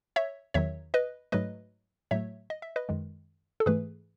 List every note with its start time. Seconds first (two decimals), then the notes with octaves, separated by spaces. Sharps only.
0.16 C#5 E5
0.54 E2 D#3 F#3 C#5 E5
0.94 B4 D#5
1.32 G#2 F#3 A3 B4 D#5
2.11 A2 F#3 A3 C#5 E5
2.50 D#5
2.62 E5
2.76 B4 D#5
2.89 F#2 D#3 G#3
3.60 A4
3.66 G#2 E3 A3 G#4 B4